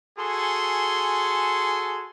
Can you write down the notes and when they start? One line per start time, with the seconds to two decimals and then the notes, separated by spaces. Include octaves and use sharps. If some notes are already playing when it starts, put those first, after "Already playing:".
0.19 F#4 G#4 A4 G#5 C6